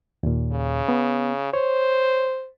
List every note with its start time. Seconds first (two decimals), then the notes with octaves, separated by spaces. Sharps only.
0.23 D#2 A#2
0.53 C#3
0.89 B3
1.54 C5 C#5